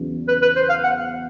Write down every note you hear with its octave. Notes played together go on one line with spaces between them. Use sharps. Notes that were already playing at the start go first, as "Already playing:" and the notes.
Already playing: E2 C#3 F#3
B4
B4
C5
F5
F#5